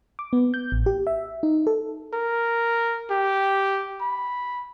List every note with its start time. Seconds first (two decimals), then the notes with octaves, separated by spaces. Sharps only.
0.19 D6
0.33 B3
0.54 G6
0.72 A1
0.86 G4
1.07 E5
1.43 D#4
1.67 A4
2.14 A#4
3.11 G4
4.01 B5